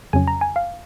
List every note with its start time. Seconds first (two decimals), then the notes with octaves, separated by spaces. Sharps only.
0.13 F2 C#3 F#3 C#4 G#5
0.28 A#5
0.41 G#5
0.56 F5